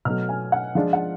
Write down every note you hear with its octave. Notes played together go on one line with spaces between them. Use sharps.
B2 F#3 A3 F6
G#5
F#5
F3 G#3 D4 F4 F5
F#5